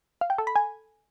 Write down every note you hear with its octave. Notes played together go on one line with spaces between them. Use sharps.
F5
G5
A4
B5
G#5